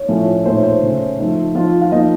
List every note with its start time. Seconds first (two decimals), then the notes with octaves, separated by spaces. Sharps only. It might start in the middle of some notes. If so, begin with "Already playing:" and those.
Already playing: C#5
0.08 A2 F3 A3 C#4
0.45 A#2 A3 D#4 C5
0.56 C#5
0.64 C5
0.82 C#3 A3 C#4
1.19 F3 A3 D#4
1.55 F3 C4 D#4 F4
1.81 F5
1.91 F3 A#3 D#4 D#5